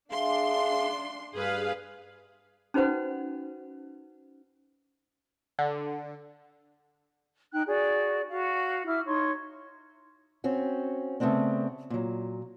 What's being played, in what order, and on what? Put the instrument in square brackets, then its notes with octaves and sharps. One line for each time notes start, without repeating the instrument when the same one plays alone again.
[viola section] D4 C6 [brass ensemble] G#4 E5 F5
[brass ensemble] G2 [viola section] G#4 B4 F5
[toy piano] C#4 D#4 F#4 B4 C5 F#5
[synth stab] D3
[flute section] D#4 G5 F#6
F#4 G#4 D5
F#4 F5
E4 E5 D6 F6
D#4 C#5 C6 C#6
[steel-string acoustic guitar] C4 C#4 F#4
C#3 A3 B3 C4 D4
A#2 F#3